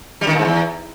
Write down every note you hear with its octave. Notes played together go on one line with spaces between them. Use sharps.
G3
D#3
A#2
G#2
E2